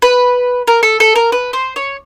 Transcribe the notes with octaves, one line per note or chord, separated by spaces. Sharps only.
B4
A#4
A4
A4
A#4
B4
C5
C#5